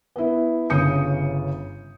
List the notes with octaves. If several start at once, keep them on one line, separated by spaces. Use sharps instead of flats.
B3 E4
G1 C#3 D#6 G6 C#7